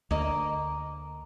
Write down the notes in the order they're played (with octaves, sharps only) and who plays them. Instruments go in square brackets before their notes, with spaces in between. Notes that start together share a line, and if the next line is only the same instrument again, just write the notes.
[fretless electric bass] D2 [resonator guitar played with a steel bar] A#3 D#5